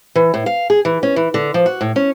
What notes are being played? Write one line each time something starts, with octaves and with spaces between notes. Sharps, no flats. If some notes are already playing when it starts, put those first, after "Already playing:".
E3
A2
F5
G#4
E3
C#4
E3
D3
F3
F#4
A2
C#4